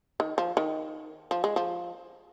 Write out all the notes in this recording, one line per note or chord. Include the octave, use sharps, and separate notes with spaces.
D#3
F3
D#3
F3
G#3
F3